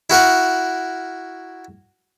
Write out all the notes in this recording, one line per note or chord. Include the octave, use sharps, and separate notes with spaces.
E4 F#4 A#4 F#5